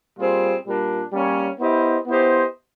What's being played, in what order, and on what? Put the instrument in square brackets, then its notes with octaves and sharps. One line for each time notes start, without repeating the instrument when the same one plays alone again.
[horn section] A#2 G3 C4 F4 G#4
A#2 G3 A#3 D4
G3 A#3 C#4
B3 E4 G4 C5 D#5
B3 E4 G4 C5 D#5